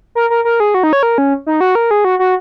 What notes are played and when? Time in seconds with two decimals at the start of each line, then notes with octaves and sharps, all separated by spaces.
0.15 A#4
0.30 A#4
0.45 A#4
0.60 G#4
0.74 F#4
0.83 D#4
0.93 C#5
1.03 A#4
1.18 C#4
1.46 D#4
1.61 F#4
1.75 A#4
1.91 G#4
2.05 F#4
2.19 F#4